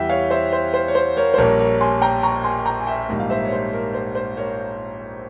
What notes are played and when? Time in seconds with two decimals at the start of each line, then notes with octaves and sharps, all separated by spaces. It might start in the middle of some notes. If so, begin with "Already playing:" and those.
Already playing: E2 E3 G3 E5 G5
0.09 C#5 F5
0.30 C5 E5
0.53 C5
0.74 C5
0.88 C#5
0.95 C5
1.17 A#4 C#5
1.34 C5
1.37 A#1 A#2 G3 A#3 A#4 C#5
1.60 A#4 C#5
1.81 G#5 C6
2.02 G5 A#5
2.23 A#5 C#6
2.44 G#5 C6
2.65 G5 A#5
2.80 G#5
2.87 E5 G5
3.09 A#1 G#2 G3 A#3
3.20 F5
3.30 C5 E5
3.45 C#5
3.52 C5
3.74 A#4
3.94 C5
4.15 C5
4.37 A#4 C#5